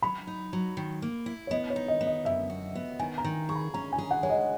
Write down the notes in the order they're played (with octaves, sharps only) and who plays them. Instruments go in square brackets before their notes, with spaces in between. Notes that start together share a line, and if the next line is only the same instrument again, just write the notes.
[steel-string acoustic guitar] F#3 [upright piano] B5
[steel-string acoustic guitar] D#4
F#3
D#3
A#3
E4
[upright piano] C#5
[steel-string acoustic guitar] B3 [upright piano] D#5
[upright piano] C#5
[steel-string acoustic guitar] D#4
[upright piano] D#5
[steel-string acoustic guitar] B3
[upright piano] D#5
[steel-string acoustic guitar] F#2 [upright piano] E5
[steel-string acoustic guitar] F#4
B3
[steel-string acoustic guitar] D#3 [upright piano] G#5
[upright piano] A#5
[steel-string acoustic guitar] D#3
[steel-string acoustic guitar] G#4 [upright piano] C#6
[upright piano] B5
[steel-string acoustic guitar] C#4 [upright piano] A#5
[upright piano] G#5
[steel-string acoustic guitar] G#4
[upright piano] F#5
[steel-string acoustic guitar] G#3 [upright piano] C#5
[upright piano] D#5